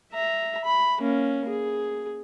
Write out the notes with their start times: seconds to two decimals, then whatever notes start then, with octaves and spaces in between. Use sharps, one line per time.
0.13 E5 A#5
0.65 B5
1.00 A#3 C#4
1.49 G#4